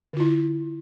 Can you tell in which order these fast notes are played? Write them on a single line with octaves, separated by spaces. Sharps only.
D3 F4 E4